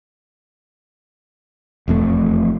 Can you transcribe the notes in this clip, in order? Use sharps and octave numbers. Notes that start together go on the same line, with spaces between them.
E1 F2 A3